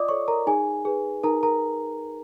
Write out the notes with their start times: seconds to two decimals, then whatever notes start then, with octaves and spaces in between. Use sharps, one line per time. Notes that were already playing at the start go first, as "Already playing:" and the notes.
Already playing: F4 D5 D#5 D6 D#6
0.09 A4 C#5 C#6
0.28 A#4 A#5
0.47 D#4 G#4 G#5
0.85 G#4 B4
1.23 D#4 A#4 A#5
1.43 A#4 A#5